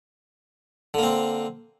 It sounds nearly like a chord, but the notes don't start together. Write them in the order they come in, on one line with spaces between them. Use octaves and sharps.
D3 A#3 C4